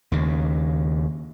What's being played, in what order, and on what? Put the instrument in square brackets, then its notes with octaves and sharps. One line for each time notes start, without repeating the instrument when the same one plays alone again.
[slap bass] D#2 C#3